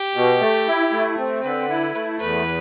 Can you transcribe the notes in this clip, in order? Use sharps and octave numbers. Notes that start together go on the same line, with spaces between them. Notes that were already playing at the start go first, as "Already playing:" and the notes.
Already playing: G4
B2
A3
E4
A3
C4
D3 B4
E4
A3
E2 B4